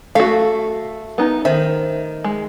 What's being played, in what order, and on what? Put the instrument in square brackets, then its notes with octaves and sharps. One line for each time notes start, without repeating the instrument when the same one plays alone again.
[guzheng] A3 [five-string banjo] F#4 F5
[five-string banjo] B3 D#4 A#5
[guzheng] D#3 [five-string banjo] C5 E5
[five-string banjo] G#3